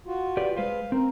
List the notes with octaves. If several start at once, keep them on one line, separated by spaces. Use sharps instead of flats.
F4 F#4
G4 B4 D5
G#3 B4 C5 F5
C4 A#4